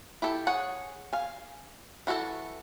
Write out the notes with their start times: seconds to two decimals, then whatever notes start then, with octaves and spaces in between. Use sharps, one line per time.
0.22 E4 G4 A4
0.47 G#4 C#5 F#5
1.13 F5 G#5
2.07 E3 F#4 G#4 A4 A5